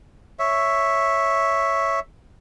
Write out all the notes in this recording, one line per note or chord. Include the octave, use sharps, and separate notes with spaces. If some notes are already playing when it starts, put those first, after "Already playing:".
C#5 E5